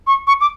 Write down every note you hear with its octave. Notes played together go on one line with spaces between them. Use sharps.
C#6
C#6
D6